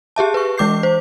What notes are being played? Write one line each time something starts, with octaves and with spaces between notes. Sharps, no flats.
G4 G#4 E5 A5
B4 C#6
E3 G#3 D6 G6 C7
C5